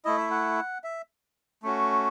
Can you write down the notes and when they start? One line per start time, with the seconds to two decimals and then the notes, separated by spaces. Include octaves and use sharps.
0.05 A3 E4 D#5
0.17 E5
0.31 F#5
0.84 E5
1.63 A3 C#4 F#4